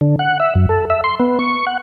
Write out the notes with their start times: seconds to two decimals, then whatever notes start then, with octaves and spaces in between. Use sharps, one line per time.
0.01 D3
0.19 F#5
0.40 E5
0.55 F#2
0.69 A4
0.90 E5
1.04 C6
1.20 B3
1.39 C#6
1.67 F#5